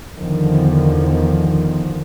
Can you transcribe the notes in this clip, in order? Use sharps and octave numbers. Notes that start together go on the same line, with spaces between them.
E2 D3 D#3 F3